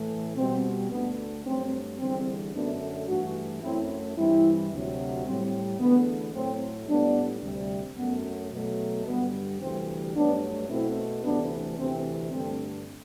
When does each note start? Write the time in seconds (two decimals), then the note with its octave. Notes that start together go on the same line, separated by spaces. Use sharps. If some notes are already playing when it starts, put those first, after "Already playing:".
Already playing: A2 E3 A3
0.36 B2 G3 C4
0.90 D2 D3 A3 B3
1.45 G2 F#3 A3 C4
1.99 E2 D3 G3 C4
2.54 F#2 D3 F#3 A3 B3 D4
3.08 G2 E3 A3 D4 F#4
3.62 F#2 F#3 A3 C4 E4
4.16 G2 E3 G3 C4 E4
4.71 D2 C3 F#3
5.25 A2 G3 C4
5.79 E2 D3 A3 B3
6.34 A2 F#3 A3 C4
6.89 A2 G3 B3 D4
7.42 D2 C3 G3
7.97 F#2 F#3 A3 B3
8.52 B2 F#3 A3
9.06 G2 D3 G3 B3
9.60 D2 C3 E3 G3 C4
10.14 G2 F#3 A3 B3 D4
10.69 B2 A3 C4 E4
11.23 D2 C3 E3 A3 B3 D4
11.78 D2 C3 E3 C4
12.32 G2 D3 A3 C4